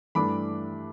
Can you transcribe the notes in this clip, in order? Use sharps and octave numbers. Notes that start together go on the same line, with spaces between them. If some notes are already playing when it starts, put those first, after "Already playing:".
G2 E3 A3 D4 B5 D6